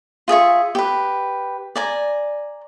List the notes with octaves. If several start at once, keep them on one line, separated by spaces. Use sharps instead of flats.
F4 G#4 E5 C#6
G4 B4
D5 G#5 A#5